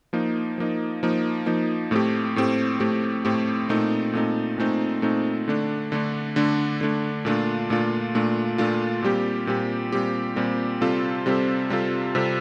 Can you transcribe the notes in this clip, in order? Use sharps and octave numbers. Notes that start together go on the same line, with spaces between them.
F3 A#3 D#4
F3 A#3 D#4
F3 A#3 D#4
F3 A#3 D#4
A2 A3 C4 G4
A2 A3 C4 G4
A2 A3 C4 G4
A2 A3 C4 G4
A#2 A3 C4 D#4
A#2 A3 C4 D#4
A#2 A3 C4 D#4
A#2 A3 C4 D#4
D3 A3 D4
D3 A3 D4
D3 A3 D4
D3 A3 D4
A#2 A3 D4 F4
A#2 A3 D4 F4
A#2 A3 D4 F4
A#2 A3 D4 F4
A#2 G3 C4 G4
A#2 G3 C4 G4
A#2 G3 C4 G4
A#2 G3 C4 G4
C3 G3 C4 F4 A4
C3 G3 C4 F4 A4
C3 G3 C4 F4 A4
C3 G3 C4 F4 A4